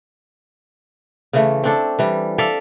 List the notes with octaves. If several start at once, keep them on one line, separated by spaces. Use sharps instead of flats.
C#3 E3 A3
C4 D4 A4
E3 G3
A4 D5 E5 F5